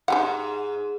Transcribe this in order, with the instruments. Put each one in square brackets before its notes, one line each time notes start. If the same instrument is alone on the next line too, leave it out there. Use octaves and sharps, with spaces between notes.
[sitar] G#2 [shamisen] D#4 G4 F#5